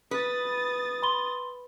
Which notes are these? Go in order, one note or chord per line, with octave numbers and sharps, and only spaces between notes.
B4 D#6 A6
B5 C6 G7